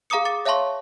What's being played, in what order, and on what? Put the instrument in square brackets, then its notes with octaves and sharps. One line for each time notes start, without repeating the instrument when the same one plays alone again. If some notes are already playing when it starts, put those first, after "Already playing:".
[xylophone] G#4 F5 A#5 D6 D#6 C#7
D6 A6 C#7
C#5 E5 F5 A5 C6 C#6